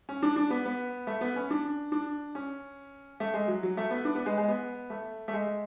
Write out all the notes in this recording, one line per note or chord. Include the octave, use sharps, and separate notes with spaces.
C#4
D4
D4
B3
B3
A3
B3
C#4
D4
D4
C#4
A3
G#3
F#3
F#3
A3
B3
D4
B3
G#3
G#3
B3
A3
A3
G#3